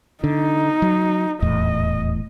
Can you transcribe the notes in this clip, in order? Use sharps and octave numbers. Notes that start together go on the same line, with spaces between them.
D3 D#4
F#3
D#1 E2 A2 D#5